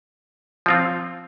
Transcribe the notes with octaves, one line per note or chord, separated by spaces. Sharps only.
F3 C4 F4